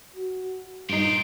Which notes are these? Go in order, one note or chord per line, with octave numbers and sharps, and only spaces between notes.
F#4
G2 A#2 D#4 F4 G4 C7 D7